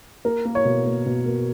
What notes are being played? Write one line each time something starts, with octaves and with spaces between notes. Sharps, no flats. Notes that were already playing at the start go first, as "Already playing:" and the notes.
A#3 A#4
A#3
C#5
B2
A#3
B2
A#3